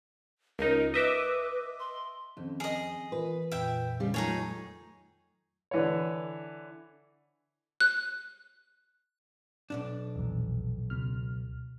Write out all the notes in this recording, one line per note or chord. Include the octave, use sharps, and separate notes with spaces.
C#2 D#4 A#4
B4 D#5 E5 D6
C6
F2 D#3 C4 C#4
G#4 D#5
E3 F4 A#4 B4
F2 A#2 E5 G5
C#3 G3
D#3 F#3 A3 D#4 F4 G#4 C#5
D3 E3 C#5
F#6
B1 G#2 D4
A#1 E2
C#2 B2 F6